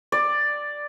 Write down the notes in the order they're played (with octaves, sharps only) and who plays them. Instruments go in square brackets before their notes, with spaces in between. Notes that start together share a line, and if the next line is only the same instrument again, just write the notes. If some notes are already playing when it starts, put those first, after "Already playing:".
[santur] D5